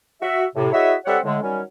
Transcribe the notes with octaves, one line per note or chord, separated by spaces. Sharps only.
F#4 E5
A2 C3
E4 F#4 G#4 C#5 D#5 E5
G3 C4 A4 C#5 E5 F#5
A2 D3 G#3
D#3 F#3 G3 C#4